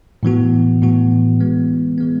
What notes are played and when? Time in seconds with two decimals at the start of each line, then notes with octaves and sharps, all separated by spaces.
0.23 A2 E3 B3 F#4
0.82 A2 E3 B3 F#4
1.40 E3 G#3 B3
1.98 E3 G#3 B3